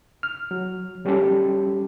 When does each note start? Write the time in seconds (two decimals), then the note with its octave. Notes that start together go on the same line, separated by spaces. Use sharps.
0.23 F6
0.51 F#3
1.05 F#3 G3 C#4 G4 A4